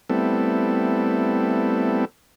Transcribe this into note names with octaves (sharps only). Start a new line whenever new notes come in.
G3 A3 B3 C4 E4 A4